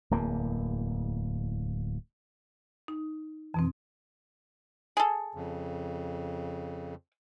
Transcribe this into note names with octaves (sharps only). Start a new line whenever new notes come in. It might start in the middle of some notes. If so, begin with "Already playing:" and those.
D1 E2 A#3
D#4
F2 B2 E3 C4
G#4 A4
F2 C#3